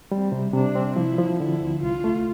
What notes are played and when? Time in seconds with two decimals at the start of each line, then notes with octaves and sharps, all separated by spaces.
0.11 G3 C4
0.32 C3
0.54 C3 D4
0.75 C4
0.96 F3 E4
1.18 F3
1.39 D3 E4
1.61 D2
1.82 C2 F4
2.04 A3